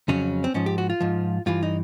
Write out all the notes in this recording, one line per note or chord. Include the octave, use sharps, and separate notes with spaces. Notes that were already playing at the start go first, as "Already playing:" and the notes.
F2 C#3 F#3 C#4
C4
G#2 F3 C#4
G4
F#4
F4
G#2 F3
G2 E3 F4
D#4